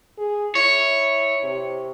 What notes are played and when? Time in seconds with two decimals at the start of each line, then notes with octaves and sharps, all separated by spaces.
0.18 G#4
0.55 E4 C#5
1.44 C3